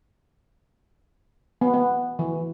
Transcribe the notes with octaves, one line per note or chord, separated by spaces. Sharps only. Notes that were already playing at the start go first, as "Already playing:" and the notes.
B3
B3
E3